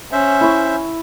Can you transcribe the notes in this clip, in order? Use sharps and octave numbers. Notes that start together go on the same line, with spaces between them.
C#4 C5 E5
E4 C#6